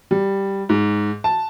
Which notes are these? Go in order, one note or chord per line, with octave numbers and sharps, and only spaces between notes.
G3
G#2
A5